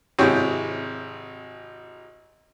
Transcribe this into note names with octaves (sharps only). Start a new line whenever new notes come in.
G#1 C3 E4 G#4 C#5 G5